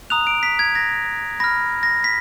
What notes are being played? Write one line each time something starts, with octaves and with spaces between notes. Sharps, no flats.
A#5 D#6 F#6 F7
D7
B6
G#6
A#6
B5 F6 A#6
A#6
B6